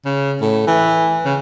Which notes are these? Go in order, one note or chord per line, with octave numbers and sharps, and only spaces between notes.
C#3
A2
E3
C#3